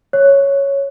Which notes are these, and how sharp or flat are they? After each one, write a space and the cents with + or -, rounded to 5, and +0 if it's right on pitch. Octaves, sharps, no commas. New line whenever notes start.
C#5 +0